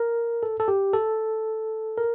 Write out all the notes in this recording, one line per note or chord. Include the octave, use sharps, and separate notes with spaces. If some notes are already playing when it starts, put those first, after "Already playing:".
Already playing: A#4
A4
A4
G4
A4
A#4